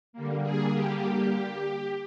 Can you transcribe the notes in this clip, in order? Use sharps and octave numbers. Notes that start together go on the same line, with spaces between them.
D3 G3 A#3
G#4
G4